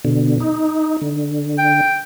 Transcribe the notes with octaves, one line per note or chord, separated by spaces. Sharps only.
B2 D3
D#4
D3
G5